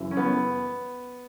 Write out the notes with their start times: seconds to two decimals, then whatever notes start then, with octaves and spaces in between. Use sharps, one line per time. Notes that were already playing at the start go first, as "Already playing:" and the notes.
Already playing: F#2 C#3 E3
0.11 C#4
0.17 B3